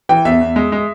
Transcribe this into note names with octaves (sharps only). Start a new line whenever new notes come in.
E3 G5
E2 E5
E2
G#3
G#3